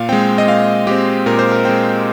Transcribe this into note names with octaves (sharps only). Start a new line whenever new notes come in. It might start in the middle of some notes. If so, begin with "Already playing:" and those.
Already playing: A#2 F5
G#3 C4 G5
D#5
A#2 F5
G#3 C4 G4
A#2 A#4
C5
A#4
G#3 C4 G5